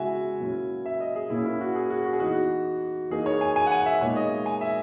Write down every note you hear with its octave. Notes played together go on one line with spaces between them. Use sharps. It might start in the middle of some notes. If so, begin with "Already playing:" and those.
Already playing: C#3 G#3 B3 E4 F#4 E5 G#5
A#2 F#3 C#4 E4
E5
D#5
G#4
A#2 A#3 C#4 E4
E4
F#4
G#4
F#4
F#4
G#4
E3 B3 D#4 F#4
E3 A#3 D#4 G#4
C#5
G#5
G#5
F#5
G#5
E5
A#2 G#3 B3 D#4 C#5
D#5
G#5
E5